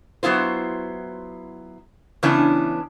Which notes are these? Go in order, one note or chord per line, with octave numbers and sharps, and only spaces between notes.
F#3 B3 E4 F4 C5
C#3 E3 B3 C#4 D4 E4